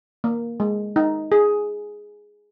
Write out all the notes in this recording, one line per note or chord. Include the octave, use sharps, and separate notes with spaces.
A#3
G#3
D#4
G#4